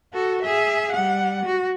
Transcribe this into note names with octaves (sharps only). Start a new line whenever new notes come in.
F#4 A4
G#4 E5
G3 F#5
F#4